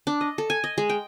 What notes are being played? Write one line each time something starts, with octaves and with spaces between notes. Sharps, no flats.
D4
D#5
A4
G#5
D#5
G#3
G5